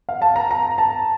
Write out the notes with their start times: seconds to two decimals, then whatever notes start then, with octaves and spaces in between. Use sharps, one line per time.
0.09 F5
0.22 A5
0.36 A#5
0.51 A#5
0.78 A5